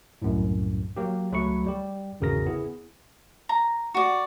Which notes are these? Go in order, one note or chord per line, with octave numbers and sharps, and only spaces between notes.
C2 F#2 A2
F#3 A#3 G4
C#2 F#3 A3 B5 C#6 C#7
G3 G4
G#1 E2 C#3 F#4 A#4 A#6
B3 E4 G#4
A#5
F#4 D5